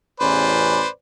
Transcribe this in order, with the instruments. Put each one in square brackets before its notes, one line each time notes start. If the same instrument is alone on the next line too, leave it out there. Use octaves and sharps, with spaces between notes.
[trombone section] A1 E2 C#4 [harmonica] B4 C5 D5